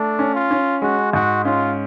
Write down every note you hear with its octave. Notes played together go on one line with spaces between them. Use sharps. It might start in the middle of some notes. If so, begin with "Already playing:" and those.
Already playing: A3 D4
C#4
F4
C#4
G#3 F#4
G#2 F#4
C#4 F4